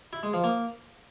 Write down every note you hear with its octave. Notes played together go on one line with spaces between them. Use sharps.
E4
G#3
F3
A#3